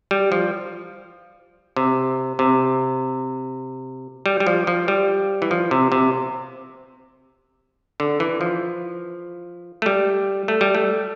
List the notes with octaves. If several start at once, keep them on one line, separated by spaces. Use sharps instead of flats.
G3
F3
C3
C3
G3
G3
F3
F3
G3
E3
F3
C3
C3
D3
E3
F3
A3
G3
A3
G3
A3